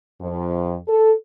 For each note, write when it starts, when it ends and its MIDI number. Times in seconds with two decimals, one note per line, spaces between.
0.19 0.75 41
0.87 1.11 69